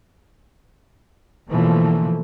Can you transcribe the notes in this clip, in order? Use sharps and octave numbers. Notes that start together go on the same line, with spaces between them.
B2 D3 E3 F3 A3 A#3